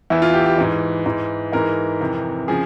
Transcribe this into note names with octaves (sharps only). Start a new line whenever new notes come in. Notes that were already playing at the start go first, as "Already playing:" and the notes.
E2 E3 E4
F4
G4
G4
G#2 E3
G#2 E3
G#2 E3 A#4
F2 C3 E3
C#3 F3 G#4